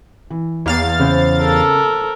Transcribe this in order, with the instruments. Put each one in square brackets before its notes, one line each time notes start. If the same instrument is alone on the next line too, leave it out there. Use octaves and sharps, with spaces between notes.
[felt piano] E3
[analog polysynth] E2 F5 A6 [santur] A#3
[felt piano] C#3 [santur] B3 C4 G5
[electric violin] A4 A#4